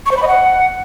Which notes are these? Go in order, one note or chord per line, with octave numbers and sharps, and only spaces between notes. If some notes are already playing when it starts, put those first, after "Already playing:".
C#6
C5
B5
D#5
F#5